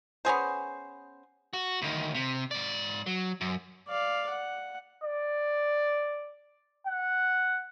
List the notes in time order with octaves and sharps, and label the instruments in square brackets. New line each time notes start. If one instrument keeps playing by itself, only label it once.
[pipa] B3 C#4 G#4 C5
[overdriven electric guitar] F#4
D2 D#3
C3
G#2 D5
F#3
F#2
[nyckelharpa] D5 F5
F#5
[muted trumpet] D5
F#5